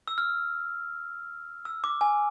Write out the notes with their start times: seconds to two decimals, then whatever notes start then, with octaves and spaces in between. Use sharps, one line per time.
0.08 E6
0.18 F6
1.65 E6
1.84 D6
2.01 G#5